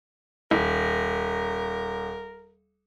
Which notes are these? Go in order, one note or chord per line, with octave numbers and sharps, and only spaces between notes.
D#1 A#4